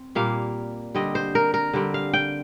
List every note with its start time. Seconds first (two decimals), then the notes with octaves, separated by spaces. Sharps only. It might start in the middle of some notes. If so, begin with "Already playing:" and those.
Already playing: C4
0.15 A#2 G3 A#3 F5
0.95 D3 G3 C4 D#5
1.15 C5
1.35 A#4
1.54 A#4
1.74 D3 G3 C4
1.94 F5
2.13 G5